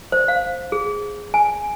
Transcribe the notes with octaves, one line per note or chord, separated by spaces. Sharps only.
C5
F5
G#4
G#5